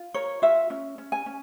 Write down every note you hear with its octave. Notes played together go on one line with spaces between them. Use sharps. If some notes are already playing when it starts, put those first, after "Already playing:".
Already playing: F4
A#4 C#5
F4 E5
C#4
C#4
G#5
C#4